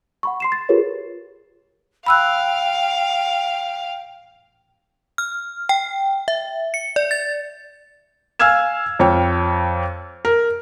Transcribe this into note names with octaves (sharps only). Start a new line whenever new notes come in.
F#5 B5 C#6
C6 C7 E7
A6
F4 G4 G#4 A#4 B4 C#5
F5 G5 B5 E6 F#6
F6
G5
E5
C#7
D5
A6
F5 G#5 E6 F6 G#6 E7
F2 C#5 G5
A#4